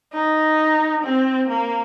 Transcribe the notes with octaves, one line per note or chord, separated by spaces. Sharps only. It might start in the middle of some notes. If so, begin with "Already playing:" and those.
D#4
C4
A#3